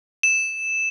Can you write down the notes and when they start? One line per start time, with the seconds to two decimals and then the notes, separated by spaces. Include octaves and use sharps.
0.23 E7